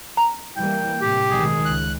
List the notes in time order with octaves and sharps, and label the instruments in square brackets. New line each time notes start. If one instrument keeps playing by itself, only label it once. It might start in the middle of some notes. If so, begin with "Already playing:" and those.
[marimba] A#5
[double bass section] E3 G3 A#3 [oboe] G5
[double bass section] A2 C3 [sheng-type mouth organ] G4
[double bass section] B1 D#3 G#3 [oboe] G#4
[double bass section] C#2 [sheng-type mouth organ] F#6